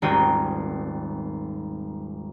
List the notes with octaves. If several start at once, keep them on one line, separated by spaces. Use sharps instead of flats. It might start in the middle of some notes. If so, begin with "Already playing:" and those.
D#1 G#1 C4 A#4 G5 D#7